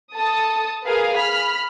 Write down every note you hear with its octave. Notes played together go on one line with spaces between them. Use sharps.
A4 A5 D#6
G#4 A#4 B4 F5
B5 F6 B6